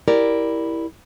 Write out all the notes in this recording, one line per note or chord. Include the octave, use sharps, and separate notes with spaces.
E4 G4 A#4 D5